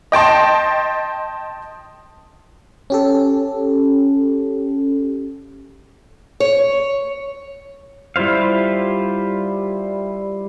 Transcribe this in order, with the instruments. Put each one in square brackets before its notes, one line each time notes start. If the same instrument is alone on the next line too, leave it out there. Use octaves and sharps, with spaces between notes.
[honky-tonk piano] D#5 G5 A5 C6
[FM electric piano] C#4 G4 A4
[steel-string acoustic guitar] C#5
[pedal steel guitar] G3 E4 F4 C5 F5